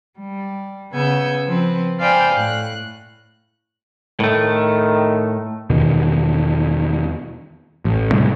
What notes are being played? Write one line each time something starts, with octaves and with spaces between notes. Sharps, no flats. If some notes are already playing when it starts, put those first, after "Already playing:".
G3
C#3 B3 G#5 E6 G6
F3 C4 B4
C5 D5 F5 G5 G#5 B5
A2 F#6
A2 D#3 A3
E2 B2 D#3
A1
A2 C3 G3 A3